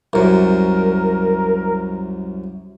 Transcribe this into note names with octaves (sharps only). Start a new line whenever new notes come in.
C2 F#2 A#4